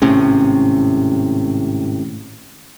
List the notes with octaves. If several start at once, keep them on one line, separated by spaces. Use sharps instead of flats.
G#1 A2 C3 C#4